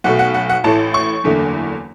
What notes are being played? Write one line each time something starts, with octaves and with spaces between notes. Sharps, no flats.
B1 B2 A3 F#5
F#5
F#5
F#5
A1 A2 E3 A3 A5
C#6
F#1 E2 D3 A3